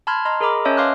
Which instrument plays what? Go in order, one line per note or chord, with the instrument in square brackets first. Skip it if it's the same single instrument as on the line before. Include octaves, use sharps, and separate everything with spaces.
[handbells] A5 B5 C6 F6 G#6
D#5 A#5 C6 F6
G#4 A#4 D#5 A#5 B5 D6
C#4 C#5 D#5 E5 A5 E6
B4 F5 C6 D6 F6 F#6